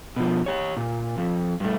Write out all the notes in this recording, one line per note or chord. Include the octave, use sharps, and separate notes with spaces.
B2 F3
G4 C#5
A#2
F2
G2 A3